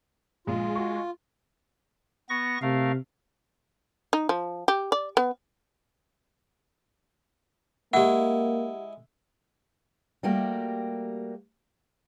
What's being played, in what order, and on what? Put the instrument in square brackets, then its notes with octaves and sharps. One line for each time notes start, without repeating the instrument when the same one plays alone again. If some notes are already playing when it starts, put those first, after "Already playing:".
[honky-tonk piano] A#1 [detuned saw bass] G#3 [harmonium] F4
[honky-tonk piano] F#4 C#6
[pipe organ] B3 C#6 A#6
[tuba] C3 [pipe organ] A3 A#4 F5
[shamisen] D#4
F3
G4
D5
B3
[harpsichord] G#3 E4 [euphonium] A#3 [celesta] G4 F#5
[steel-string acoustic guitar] G3 A3 A#3 F#4 G4